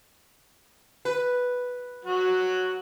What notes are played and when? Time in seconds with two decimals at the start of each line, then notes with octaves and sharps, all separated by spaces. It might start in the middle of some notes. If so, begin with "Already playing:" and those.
1.05 B4
2.05 F#3 F#4